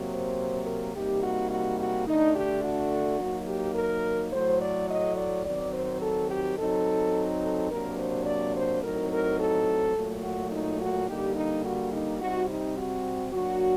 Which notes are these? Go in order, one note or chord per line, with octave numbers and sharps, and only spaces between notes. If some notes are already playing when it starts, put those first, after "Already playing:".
Already playing: C3 F#3 A#3
C5
A#4
C3 G3 A#3 D#4 G4
F#4
F#4
F#4
D3 A3 D4 D#4
G4
F#4
F#3 A#3 D#4
G4
A#4
A2 F#3 A3 C5
D5
D#5
D5
D#3 F#3 C4 D5
C5
A4
G4
F#3 C4 D#4 A4
A4
C3 F#3 A#3 D4 A#4
C5
D5
C5
A2 F#3 C4 D#4 A#4
A#4
A4
A#2 F#3 A3
F#4
D#4
F#4
D3 G3 A#3 D#4 G4
D#4
F#4
D#4
C3 G3 C4 D#4 F#4
D#4
F#4
F#3 A#3 D4 F#4